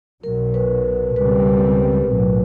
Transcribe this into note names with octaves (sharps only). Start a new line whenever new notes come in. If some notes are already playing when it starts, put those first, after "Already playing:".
B1 B2 F#3 A#4
B4
C#2 B2 G3 C4 B4
B1 A2 F#3